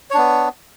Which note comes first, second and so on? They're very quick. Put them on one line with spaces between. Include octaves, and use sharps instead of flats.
C#5 D4 B3